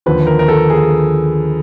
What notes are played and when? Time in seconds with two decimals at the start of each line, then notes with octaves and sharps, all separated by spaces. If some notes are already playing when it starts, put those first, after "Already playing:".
0.06 D#2 D3 F3 B4
0.27 A#4
0.39 A#4
0.48 A4
0.70 G#4